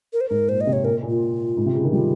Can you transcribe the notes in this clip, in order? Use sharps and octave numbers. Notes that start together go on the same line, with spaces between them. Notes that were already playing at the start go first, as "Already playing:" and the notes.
A#4
C5
G#2 A#4
A#2 C5
D#5
C3
C#5
A#2 A#4
A#2
F4
G#2
C3
C#3
D#3
G3 F4